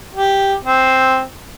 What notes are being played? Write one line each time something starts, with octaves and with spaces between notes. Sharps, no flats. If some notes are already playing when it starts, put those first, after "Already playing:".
G4
C4